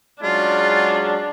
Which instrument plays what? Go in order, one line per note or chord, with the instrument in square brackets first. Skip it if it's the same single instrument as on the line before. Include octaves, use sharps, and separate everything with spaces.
[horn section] F#3 G#3 C#4 [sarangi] D4 [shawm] F4